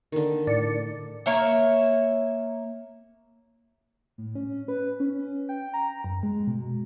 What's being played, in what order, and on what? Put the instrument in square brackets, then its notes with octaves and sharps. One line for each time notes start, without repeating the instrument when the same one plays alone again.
[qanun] D3 D#3
[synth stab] A2 D5 C#7
[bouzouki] A#3 C#5 E5
[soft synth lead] A2
C#4
B4
C#4
G5
A#5
F#2
G#3
B2